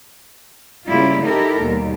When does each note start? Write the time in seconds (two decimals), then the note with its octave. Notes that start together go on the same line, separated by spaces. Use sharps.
0.86 C#3 G3 A#3 E4 F4
1.24 D#4 E4 G4 A4 A#4
1.63 D#2 B2 G3